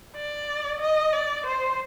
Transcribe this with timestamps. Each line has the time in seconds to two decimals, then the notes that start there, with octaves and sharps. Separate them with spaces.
0.16 D5
0.80 D#5
1.13 D5
1.46 C5